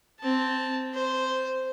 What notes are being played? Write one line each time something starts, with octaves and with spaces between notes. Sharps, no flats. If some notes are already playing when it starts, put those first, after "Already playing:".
C4 A5
C5